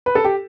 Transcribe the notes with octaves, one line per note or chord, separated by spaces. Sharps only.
B4
A4
G4